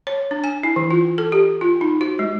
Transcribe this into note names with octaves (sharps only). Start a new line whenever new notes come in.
C#5
D4
G#5
E4
E3
F4
A4
G4
F4
D#4
F#4
G#3